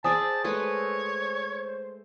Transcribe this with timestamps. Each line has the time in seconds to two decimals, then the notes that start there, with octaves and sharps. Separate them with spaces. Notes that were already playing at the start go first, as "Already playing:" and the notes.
0.04 G#4 C5 D5 E5 G#5 A5 D#6
0.44 G#3 A3 B4 C#5